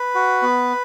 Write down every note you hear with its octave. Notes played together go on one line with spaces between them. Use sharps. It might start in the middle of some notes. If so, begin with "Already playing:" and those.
Already playing: B4
F#4
B3